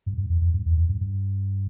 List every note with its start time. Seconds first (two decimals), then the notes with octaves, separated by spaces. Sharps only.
0.06 G2
0.18 G2
0.30 F2
0.41 F2
0.54 G2
0.66 E2
0.77 F2
0.89 G2
1.01 G2